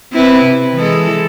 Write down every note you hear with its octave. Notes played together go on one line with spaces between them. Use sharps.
C4 E4 B4
C3
E3 G#3 A4